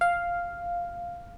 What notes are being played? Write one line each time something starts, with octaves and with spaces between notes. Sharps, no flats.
F5